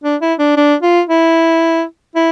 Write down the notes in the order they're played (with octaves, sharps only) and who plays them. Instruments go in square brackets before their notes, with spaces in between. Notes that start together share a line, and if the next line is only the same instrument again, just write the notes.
[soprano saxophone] D4
E4
D4
D4
F4
E4
E4